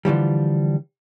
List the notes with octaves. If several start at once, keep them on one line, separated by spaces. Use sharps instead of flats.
D3 E3 F3 G3